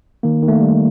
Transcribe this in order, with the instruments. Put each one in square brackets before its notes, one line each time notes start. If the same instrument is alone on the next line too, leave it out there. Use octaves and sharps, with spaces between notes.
[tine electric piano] D#3 A#3
D#3
A3
A#3
G3